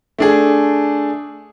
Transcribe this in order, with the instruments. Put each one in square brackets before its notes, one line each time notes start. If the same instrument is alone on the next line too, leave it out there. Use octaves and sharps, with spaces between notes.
[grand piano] A3 D4 G#4